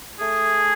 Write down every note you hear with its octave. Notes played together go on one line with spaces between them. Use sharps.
A3 G#4